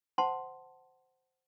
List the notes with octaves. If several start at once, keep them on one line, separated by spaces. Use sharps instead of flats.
C5 F#5 A5 C6